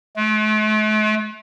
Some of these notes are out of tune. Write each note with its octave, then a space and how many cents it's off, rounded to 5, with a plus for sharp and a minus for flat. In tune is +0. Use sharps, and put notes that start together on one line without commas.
A3 -45